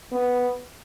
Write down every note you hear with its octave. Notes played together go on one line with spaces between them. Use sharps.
B3